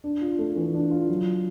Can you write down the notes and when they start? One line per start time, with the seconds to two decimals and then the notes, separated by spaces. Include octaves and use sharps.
0.04 D4
0.22 F4
0.38 A3
0.56 E3
0.74 D4
0.91 F4
1.09 F#3